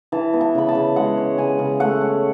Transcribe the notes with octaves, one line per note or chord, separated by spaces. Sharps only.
E3 A5
B3
A5
C#3 B5
A5
C#3
G#3 F#5
C#4
C#3 G#5
C#3
A3 F#5
C#4